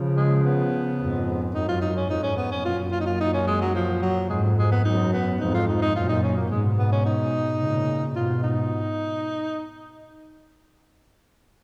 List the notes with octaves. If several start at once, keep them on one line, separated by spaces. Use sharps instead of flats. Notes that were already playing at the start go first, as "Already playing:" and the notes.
Already playing: C#3 F3
G#3
B3
F2 G#2
F#2 D#4
F4
D#4
C#4
F2 G#2 D#4
C#4
B3
C#4
F#2 A#2 F4
F4
D#4
F4
D#4
C#4
G#3
F#3
F3
F#3
F2 G#2 G#3
G#3
B3
F#2 D#4
B3
F2 G#2 D#4
F4
D#4
D#4
F#2 A#2 F4
D#4
C#4
A#3
G#2 B2 G#3
B3
C#4
D#4
A#2 C#3
G#2 B2 F4
D#4